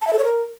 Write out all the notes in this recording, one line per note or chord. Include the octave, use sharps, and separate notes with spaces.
A5
E5
A4
C#5
A#4